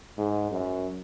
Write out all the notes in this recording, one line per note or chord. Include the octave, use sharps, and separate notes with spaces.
G#2
F#2